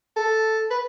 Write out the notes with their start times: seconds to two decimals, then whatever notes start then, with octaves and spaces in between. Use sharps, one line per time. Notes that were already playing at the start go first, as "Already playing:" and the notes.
0.16 A4
0.71 B4